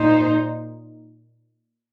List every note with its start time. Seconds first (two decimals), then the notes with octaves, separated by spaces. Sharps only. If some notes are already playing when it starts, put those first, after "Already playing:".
Already playing: A#2 D#4 C5